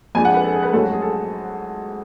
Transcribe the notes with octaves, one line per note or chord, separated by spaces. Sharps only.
F2 F3 G#3 D4 G#5
F#5
B4
A4
G#4
B4
G#2 F#3 A3 C#4 A4
F#4
G#4
A4